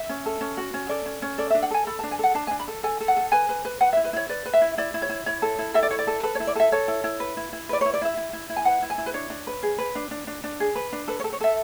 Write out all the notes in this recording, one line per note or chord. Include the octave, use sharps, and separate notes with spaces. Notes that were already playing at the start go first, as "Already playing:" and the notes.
Already playing: E5
C#4
A4
C#4
F#4
C#4
A4 D5
C#4
C#4
A4 D5
E5
D4
F#5
A4 G#5
A4 B5
A5
D4
G#5
A4 F#5
D4 A5
G#5
D4
B5
A4
A4 G#5
A4
F#5
A4
B4 G#5
B4
B4
B4 F#5
E5
E4
B4
E4 C#5
B4 D5
B4
E5
E4
E4 D5
E4
C#5
E4
E4 C#5
A4
E4
A4 E5
D5
E4 C#5
D5
A4
A4 B4
C#5
E4
D5
A4 E5
A4 C#5
E4
E4
B4
E4
E4
B4 D5
C#5
E4
D5
E4 E5
E4
E4
E4
G#5
B4 F#5
E4
G#5
E4
B4
D4 C#5
D4
B4
G#4
B4
D4
D4
D4
D4
G#4
B4
D4
A4 B4
C#5
A4
C#5
A4 E5